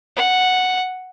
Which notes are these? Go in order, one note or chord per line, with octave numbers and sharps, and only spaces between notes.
F#5